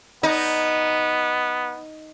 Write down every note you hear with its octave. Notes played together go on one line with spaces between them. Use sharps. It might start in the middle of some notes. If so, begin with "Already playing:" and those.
B3 D#4